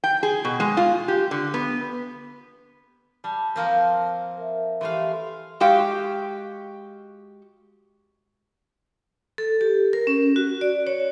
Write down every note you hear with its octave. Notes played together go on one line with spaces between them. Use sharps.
G5
G#4
B2
G#3
F4
G4
D3
B3
G3 A5
F3 A#3 C4
A#4 E5
E3 A3 G4 E5 F5 C6
G#3 F#4 G4 F5 G5
A4
G4
A#4
C#4
F#4
D5
C#5